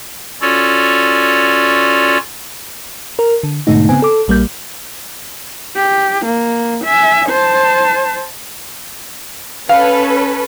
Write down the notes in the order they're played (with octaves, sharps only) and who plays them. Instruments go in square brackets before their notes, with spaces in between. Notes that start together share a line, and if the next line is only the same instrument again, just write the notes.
[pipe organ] C#4 F4 F#4 A4 C#5 D5
[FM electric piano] A#4
D3
G#2 B2 D3 A3 D#4
C#3 B3 C4 G#5
A4 D6
A#1 G3 A#3 G6
[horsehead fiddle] G4
A#3
E5 G#5
C5 A5
[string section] C#4 A4 B4 [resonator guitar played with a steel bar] F5